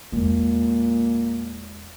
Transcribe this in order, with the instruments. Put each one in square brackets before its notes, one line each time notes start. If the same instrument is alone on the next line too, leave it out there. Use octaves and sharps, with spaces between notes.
[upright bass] E2 G#3 [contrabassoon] A#2